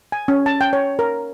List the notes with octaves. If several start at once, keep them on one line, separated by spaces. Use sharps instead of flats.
G#5
C#4
A5
G5
C#5
A#4